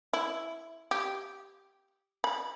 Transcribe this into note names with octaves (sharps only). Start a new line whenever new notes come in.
E4
G4
B5